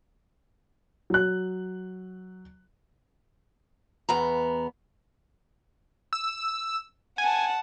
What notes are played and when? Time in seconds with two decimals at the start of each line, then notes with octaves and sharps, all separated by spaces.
1.10 F#3 F#6
4.09 E2 B3 A#5
6.13 E6
7.18 F#5 G#5 A5